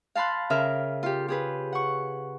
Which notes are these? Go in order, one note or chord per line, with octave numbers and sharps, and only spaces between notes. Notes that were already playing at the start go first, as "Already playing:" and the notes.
F5 A5 B5 C6 F#6
C#3 A#4 E5 F6
F4 G4
G4 G#4 B4
F#5 C#6